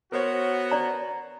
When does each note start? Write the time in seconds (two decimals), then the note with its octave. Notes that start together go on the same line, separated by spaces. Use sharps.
0.12 B3 F#4 A#4 C5 C#5
0.71 D5 A#5